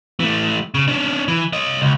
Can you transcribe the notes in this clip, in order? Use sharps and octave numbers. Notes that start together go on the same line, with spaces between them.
E3 A3
C#3
C#4 D4
E3
C#5 D#5
C#2